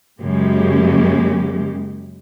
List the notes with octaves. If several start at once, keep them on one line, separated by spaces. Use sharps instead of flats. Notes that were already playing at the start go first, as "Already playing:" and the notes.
F#2 C#3 G#3 A#3 G4